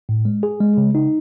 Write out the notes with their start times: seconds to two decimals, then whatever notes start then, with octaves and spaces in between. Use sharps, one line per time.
0.09 A2
0.25 G#3
0.43 G#4
0.60 G#3
0.77 C#3
0.95 D#4